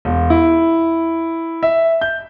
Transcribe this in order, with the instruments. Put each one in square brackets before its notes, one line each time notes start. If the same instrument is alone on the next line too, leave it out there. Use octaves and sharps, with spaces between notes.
[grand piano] E1
E4
E5
G6